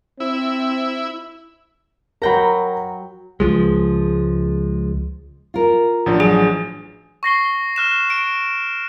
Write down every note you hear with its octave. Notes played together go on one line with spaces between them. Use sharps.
C4 E4
F#3 A#4 G5 A#5 B5
C#2 F3 G#3
F4 A#4
A1 F3 D4
F#3 G#4
C#6 A#6 C7 G7
F6 F#6 E7
D7